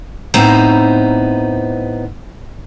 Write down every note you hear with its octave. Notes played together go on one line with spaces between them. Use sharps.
A2 B3 C4 D#4 C5 A#5